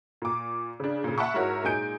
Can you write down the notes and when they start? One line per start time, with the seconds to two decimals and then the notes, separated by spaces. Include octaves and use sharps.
0.22 A#2 D6
0.80 C#3 D4
1.04 A#2 C#3
1.18 E5 F#5 A5 B5 C#6
1.34 G#2 E4 F#4 A#4 C#5
1.64 A#2 G#3 D#4 G#5 G6 D7